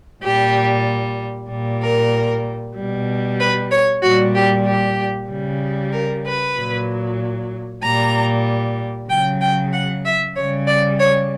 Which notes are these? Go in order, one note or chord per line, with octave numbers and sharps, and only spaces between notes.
A#2 G3 G4
A#2 G3
A#4
B2 G3
B4
C#5
A#2 G3 F#4
G4
G4
C#3 G3
A#4
B4
A#2 F#3
A#2 G3 A#5
C#3 F#3 G5
G5
F#5
E5
C#3 C#5
G3
D5
C#5